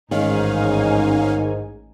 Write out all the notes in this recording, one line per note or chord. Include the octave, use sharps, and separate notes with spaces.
A1 G#2 D#3 C#4 D#4 F5 G#5